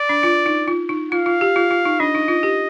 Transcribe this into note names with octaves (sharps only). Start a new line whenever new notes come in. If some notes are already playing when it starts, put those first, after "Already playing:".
Already playing: D5
D4
F4
D#4
F4
D#4
F4 F5
F4
G4
F4
F4
D#4
D4 D#5
D#4
F4
G4